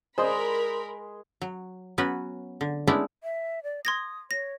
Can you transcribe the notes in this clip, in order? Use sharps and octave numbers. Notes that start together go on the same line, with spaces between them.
G#3 A#4 C5 D5 D#5 B5 C6
F#3
F#3 B3 C#4 F#4 B4
D3
G#3 A3 B3 C#4 D4 E4
E5
D5
C6 D#6 G#6 A#6
C#5 A#6